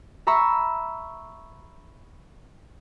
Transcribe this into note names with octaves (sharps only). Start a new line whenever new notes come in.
E5 A#5 B5 C#6 E6